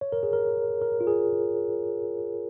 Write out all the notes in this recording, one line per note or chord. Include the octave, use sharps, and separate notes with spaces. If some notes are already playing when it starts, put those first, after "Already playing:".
C#5
A#4
G#4
A#4
A#4
F4
G#4